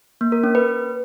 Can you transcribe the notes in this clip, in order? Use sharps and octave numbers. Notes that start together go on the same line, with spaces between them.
A#3
A#4
C#4
B4